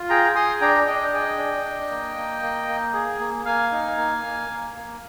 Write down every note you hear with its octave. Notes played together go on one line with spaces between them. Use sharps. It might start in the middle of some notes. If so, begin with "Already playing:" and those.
Already playing: F4
G#4 G5 A#5
G#4 C6 D#6
D4 G5 A#5
D4 D#5 G5
G#4 D#5 G5
D4
D4
A#3
A#3
A#3
A#3
G#4
A#3
A#3 F5 G#5
D#4
A#3
A#3
A#3
A#3